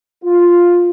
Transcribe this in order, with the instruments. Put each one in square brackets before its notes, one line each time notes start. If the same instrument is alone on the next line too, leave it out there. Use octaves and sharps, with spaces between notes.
[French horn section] F4